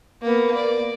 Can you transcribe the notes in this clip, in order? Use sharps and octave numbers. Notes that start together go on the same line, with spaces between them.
A#3 B3
D5